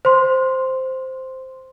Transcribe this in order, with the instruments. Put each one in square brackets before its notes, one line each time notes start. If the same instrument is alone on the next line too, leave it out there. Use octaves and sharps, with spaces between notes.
[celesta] C5 C6